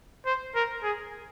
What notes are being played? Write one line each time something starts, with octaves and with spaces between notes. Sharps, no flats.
C5
A#4
G#4